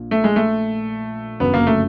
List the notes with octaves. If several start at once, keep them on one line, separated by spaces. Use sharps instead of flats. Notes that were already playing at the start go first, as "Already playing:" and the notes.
Already playing: A#1 A#2
A3
G#3
A3
G1 F#2 C#3 B3
A#3
A3